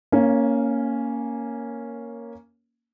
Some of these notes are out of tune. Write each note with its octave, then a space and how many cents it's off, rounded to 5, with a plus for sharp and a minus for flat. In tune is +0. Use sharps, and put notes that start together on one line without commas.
A#3 +0 C#4 +0 F5 -35